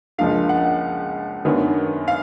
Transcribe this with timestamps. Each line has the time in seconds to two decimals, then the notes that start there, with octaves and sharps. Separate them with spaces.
0.18 C#2 C#3 F3 A#3 D4 F5
0.49 F#5
1.45 F#2 D#3 F#3 B3 D4
2.08 F5